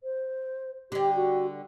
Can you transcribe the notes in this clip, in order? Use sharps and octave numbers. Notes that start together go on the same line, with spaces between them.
C5
D3 G3 G4
F#4